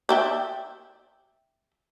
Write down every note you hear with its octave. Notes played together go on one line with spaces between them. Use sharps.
D5 E5 G5